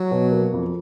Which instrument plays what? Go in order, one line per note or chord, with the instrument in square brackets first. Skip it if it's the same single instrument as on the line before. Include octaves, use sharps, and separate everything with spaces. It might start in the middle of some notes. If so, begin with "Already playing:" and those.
Already playing: [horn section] F#3
[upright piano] B2
A#3
F2